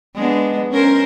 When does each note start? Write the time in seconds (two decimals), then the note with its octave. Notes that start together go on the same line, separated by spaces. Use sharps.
0.15 G#3 B3 D4
0.72 C#4 A#4 C5